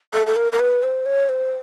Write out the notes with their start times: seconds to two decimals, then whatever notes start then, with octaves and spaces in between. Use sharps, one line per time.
0.13 A4
0.27 A4
0.36 A#4
0.52 A#4
0.60 B4
0.83 C5
1.06 C#5
1.29 C5